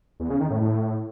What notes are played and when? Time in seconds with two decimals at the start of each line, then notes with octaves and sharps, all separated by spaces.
0.20 E2
0.30 C#3
0.40 D#3
0.50 A2
0.61 A2